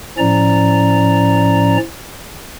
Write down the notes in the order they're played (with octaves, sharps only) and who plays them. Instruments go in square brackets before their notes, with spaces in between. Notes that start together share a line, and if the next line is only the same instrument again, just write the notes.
[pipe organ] A2 F3 C#4 D5 A#5